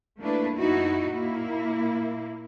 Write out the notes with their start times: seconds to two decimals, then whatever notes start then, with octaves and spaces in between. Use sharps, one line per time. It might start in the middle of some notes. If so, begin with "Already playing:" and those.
0.19 A3 A#3 D4 E4 B4
0.57 F#2 D#4 E4 F#4
1.08 A#2 A#3 E4